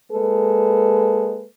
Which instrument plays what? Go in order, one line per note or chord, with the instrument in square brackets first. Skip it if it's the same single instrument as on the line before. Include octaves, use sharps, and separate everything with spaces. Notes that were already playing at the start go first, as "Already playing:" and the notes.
[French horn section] G#3 A#3 A4 B4